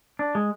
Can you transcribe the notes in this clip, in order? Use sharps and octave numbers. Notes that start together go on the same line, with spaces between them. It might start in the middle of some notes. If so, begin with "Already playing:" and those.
D4
G#3